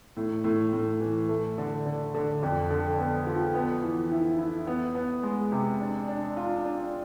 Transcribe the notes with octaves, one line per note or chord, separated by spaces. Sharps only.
A2
A2
A2
E3
A3
D3
D3
D3
F2
D3
B3
F3
B3
E3
E4
E4
B3
B3
G#3
C3
D4
D4
F4
D4